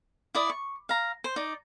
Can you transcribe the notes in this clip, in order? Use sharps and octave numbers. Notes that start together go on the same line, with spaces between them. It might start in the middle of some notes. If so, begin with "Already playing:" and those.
E4 D5 D#6
C#6
F5 A#5
C5
D#4 D5